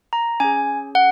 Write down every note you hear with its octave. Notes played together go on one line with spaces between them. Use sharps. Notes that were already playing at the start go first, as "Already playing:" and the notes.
A#5
C#4 G#4 G#5
F#5